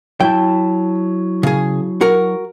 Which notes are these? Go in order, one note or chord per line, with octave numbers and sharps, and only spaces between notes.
F#3 E4 G5 A5
C#3 G#4
F#4 A#4